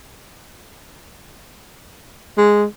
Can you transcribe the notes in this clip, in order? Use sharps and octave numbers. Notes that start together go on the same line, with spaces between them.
G#3